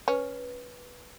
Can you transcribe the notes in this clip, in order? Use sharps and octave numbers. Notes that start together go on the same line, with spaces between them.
C#4 B4